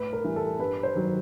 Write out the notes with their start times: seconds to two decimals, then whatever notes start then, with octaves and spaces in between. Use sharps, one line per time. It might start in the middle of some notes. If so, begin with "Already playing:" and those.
Already playing: A2 B4
0.13 A#4
0.24 E3 G3
0.36 A4
0.59 G2 B4
0.83 C5
0.95 D#3 F#3